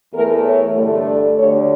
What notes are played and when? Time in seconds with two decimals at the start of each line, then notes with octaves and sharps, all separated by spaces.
0.14 E2 E3 A3 A#4
0.45 C#5
0.76 G2 D3 A3
1.07 D5
1.38 D2 D3 G3 C#5